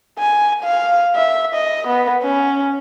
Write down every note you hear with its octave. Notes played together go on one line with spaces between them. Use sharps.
G#5
F5
E5
D#5
B3
C#4